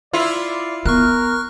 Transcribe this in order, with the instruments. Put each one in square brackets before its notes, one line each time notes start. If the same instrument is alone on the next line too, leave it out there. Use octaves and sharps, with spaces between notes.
[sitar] E4 F4 [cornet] D5
[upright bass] B3 [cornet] A#4 [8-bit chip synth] C#6 F6 F#6